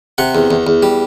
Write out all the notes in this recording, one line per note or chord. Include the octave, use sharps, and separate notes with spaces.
C3 F#5
E2
E2
E2
G3